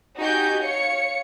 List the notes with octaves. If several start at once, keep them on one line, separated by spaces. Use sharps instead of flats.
D#4 F#4 G4 G#5 G6
C#5 F5 C#7